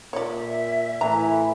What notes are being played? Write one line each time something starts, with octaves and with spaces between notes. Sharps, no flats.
A#2 C#5 D5 E5
A2 E3 A#5